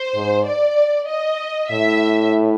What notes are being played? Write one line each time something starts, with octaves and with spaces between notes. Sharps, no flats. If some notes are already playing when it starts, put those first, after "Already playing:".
Already playing: C5
G#2
D5
D#5
A2 E5